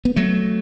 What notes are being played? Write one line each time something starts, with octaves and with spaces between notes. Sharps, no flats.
B3
F#3 A3